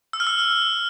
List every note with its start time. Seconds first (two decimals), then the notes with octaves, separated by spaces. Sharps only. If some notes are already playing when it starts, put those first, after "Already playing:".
0.13 E6
0.20 F6
0.27 E6